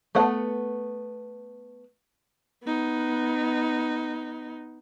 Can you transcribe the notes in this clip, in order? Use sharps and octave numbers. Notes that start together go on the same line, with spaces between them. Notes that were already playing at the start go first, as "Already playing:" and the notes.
A3 B3 F#5
B3 D#4